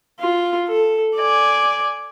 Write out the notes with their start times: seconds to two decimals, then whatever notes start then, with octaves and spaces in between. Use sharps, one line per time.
0.20 F4
0.68 A4
1.17 D5 G#5